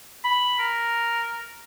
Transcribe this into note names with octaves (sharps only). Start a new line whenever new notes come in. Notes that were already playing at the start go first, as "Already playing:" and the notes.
B5
A#4